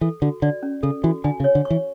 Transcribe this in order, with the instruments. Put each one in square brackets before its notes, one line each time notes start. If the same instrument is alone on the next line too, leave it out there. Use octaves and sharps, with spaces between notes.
[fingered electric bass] E3 [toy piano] A4
[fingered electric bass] D3 [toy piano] F#4
[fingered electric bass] D3 [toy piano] D5
[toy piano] C#4
[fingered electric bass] C#3 [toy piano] A4
[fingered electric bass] E3 [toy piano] F#4
[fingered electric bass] D3 [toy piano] G#5
[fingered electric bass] C#3
[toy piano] C#5
[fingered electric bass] D3
[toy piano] C#6
[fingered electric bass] E3